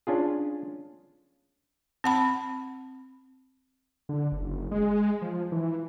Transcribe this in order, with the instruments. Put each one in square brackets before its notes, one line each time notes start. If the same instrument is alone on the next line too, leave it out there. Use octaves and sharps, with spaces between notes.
[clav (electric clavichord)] C#4 D4 F4 G#4
[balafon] C4 F#5 B5
[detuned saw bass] D3
F#1
G#3
F3
E3